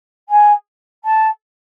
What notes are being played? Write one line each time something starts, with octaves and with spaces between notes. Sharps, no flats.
G#5
A5